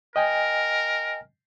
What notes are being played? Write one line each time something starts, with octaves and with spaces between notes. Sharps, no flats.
A#4 D#5 G5 G#5